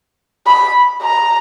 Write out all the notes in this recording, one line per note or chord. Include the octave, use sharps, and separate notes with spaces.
B5
A#5